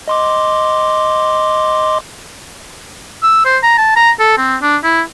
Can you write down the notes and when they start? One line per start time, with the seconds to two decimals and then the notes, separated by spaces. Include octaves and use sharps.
0.08 D#5 C6 D6
3.23 E6
3.45 C5
3.63 A#5
3.78 A5
3.96 A#5
4.20 A4
4.38 C4
4.62 D4
4.84 E4